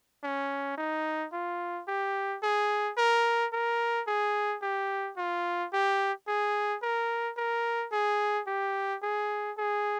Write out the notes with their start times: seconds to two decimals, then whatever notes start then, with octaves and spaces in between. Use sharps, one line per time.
0.23 C#4
0.77 D#4
1.32 F4
1.88 G4
2.43 G#4
2.97 A#4
3.53 A#4
4.07 G#4
4.62 G4
5.17 F4
5.73 G4
6.27 G#4
6.82 A#4
7.37 A#4
7.92 G#4
8.47 G4
9.02 G#4
9.57 G#4